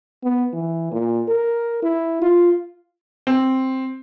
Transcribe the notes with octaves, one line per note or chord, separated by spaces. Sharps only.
B3
E3
A#2
A#4
E4
F4
C4